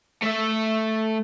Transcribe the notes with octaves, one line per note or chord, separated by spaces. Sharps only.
A3 E5